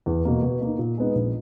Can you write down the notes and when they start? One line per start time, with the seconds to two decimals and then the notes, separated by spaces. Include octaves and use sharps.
0.06 E2
0.25 B2 A#3
0.42 B2
0.62 A#3 D#4
0.79 A#2
0.98 G#3 B3 D#4
1.15 A#1